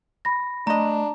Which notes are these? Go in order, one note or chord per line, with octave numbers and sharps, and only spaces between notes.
B5 A#6
A3 D4 D#5 A#5